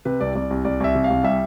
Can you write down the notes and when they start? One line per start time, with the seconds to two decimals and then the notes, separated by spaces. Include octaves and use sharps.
0.05 C3 B4
0.20 C2 D5
0.35 C2 D5
0.51 C2
0.65 C2 D5
0.80 C2 E5
0.95 C3
1.04 F5
1.10 C2
1.24 G3 E5